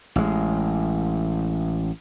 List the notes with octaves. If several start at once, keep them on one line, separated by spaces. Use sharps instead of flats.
A1 G#3